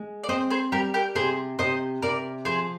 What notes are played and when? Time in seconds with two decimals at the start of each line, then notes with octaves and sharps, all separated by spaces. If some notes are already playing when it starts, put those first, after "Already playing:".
Already playing: G#3
0.23 D5
0.28 C4 C5 D#5
0.50 G#4 C5
0.72 G3 G4 A#4
0.94 G4 A#4
1.15 C3 G#4 C5
1.59 C3 C5 D#5
2.02 C3 A#4 D5
2.45 F3 G#4 C5